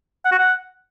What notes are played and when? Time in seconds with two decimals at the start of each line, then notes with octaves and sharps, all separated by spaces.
0.25 F#5
0.32 F#4
0.39 F#5